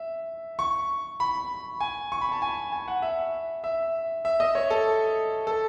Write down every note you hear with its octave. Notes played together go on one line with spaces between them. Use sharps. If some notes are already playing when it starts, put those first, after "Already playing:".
Already playing: E5
C#6
B5
G#5
C#6
B5
A5
G#5
G#5
F#5
E5
E5
E5
D#5
C#5
A4
A4